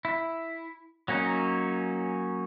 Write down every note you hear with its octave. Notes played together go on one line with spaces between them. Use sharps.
E4
F#3 A#3 C#4 D#4